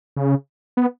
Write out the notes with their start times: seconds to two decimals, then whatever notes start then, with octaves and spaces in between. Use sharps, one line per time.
0.17 C#3
0.77 B3